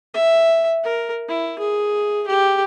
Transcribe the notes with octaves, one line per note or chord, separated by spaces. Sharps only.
E5
A#4
E4
G#4
G4